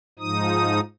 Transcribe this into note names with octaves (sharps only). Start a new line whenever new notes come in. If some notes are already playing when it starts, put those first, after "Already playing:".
G#2 F3 D#4 D#6